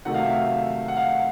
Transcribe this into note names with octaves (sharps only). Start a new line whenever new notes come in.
C3 D#3 F#3 A3 F#5
F5
E5
F5
F#5
F5